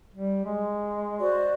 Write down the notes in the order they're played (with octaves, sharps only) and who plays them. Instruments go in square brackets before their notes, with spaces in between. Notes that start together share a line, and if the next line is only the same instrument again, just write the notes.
[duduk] G3
G#3
[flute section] F#4 C5 D5